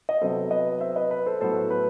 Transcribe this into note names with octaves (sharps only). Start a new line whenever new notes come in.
D#5
C3 F#3 B3 A4 C5
B4 D#5
C5 E5
B4 D#5
B4
A4 C5
A2 F#3 B3 A4 C5
B4